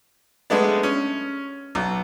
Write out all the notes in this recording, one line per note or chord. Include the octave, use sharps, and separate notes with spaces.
G#3 A3 B3 D4
C#4
B1